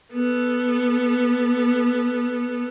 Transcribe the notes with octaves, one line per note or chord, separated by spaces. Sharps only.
B3 A4